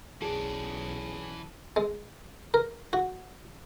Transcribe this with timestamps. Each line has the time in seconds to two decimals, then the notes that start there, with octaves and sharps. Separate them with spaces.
0.22 B1 E3 C#4 G#4 D5 A5
1.76 G#3
2.54 A#4
2.93 F#4